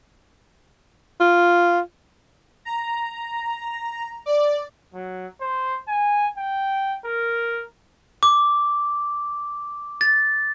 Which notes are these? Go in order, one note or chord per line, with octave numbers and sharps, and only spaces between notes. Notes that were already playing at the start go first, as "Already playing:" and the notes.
F4
A#5
D5
F#3
C5
G#5
G5
A#4
D6
A6